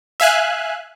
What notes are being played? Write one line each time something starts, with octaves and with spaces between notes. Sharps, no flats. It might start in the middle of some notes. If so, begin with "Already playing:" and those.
E5 F5 G#5 F#6